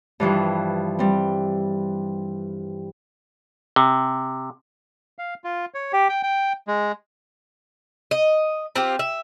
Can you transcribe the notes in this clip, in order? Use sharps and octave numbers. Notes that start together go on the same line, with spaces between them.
G2 E3 F3 G3
G3 C4
C3
F5
F4
C#5
G4
G5
G5
G#3
D#5
C4 F4 G4
E5